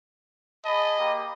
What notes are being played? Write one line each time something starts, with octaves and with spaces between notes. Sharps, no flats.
G#4 D#5 A5 B5
A#3 G4